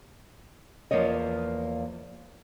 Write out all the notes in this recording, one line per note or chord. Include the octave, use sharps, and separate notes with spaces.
E2 F3 A#3 C#5 D#5